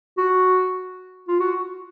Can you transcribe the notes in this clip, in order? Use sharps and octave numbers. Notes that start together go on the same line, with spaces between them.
F#4
F4
F#4